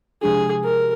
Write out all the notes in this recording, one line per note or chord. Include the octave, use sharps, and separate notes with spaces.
C3 F3 G#3 D4 G4 G#4
A#4